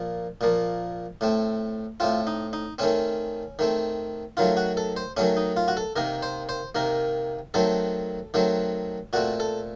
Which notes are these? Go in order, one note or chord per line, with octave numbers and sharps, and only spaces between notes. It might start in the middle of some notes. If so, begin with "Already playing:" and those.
Already playing: A#2 F3 A#3
A#2 F3 A#3
A2 A3 C4
A2 A3 C4 F4
D#4
D#4
D#3 A3 C4 C#4
D#3 A3 C4
D#3 F#3 A3 F4
F#4
A4
C5
D#3 F#3 A3 C#4
D#4
F4
F#4
A4
C3 D#3 A#3 A#4
C5
C5
C3 D#3 A#3 A#4
D#3 F#3 A3 C4 A4
D#3 F#3 A3 C4
A#2 A3 C4 F#4
A4